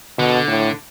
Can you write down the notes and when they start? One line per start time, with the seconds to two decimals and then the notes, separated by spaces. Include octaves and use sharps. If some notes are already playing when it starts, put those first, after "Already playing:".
0.18 B2 D3
0.48 A2